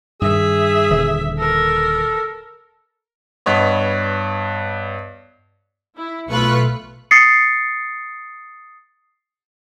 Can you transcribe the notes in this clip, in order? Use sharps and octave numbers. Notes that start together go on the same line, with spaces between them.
G2 D#3 G#4 E5
D#1 D3 E3
A4 A#4
G2 B3 C#5 D#5
E4
B1 A3 F4 B4 C#6 F#6
D#6 A6 C7 C#7